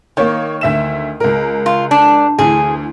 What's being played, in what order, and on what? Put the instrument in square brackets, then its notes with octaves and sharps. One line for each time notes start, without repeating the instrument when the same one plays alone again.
[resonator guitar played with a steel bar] D#3 [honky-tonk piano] A#3 C#5
[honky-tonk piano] D2 E5 E7
C#2 A#4
[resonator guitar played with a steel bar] F4
D4
[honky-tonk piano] D2 E3 [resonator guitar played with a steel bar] G#4